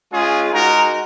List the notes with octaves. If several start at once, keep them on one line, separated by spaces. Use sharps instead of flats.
G#3 C#4 F4 G#4
G#3 D#4 F#4 A#4